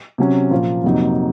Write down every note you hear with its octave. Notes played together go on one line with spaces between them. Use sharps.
C3 F#3 C#4
A#2 F3 A#3 F4
F2 C3 F#3 A#3 D#4